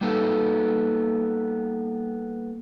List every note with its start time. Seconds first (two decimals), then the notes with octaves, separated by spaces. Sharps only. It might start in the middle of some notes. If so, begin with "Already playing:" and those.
0.01 G3 A#3 B3 D#4 A4